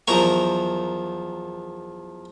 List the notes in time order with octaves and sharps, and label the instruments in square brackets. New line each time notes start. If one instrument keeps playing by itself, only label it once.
[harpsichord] E2 F3 F#3 A#4 A#5 C#6